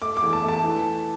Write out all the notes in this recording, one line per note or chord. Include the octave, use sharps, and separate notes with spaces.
A3 D6
D6
E2
A5
A3 A5
E3